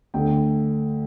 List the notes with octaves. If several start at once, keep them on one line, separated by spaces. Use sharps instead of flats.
D2 D3 A3 G5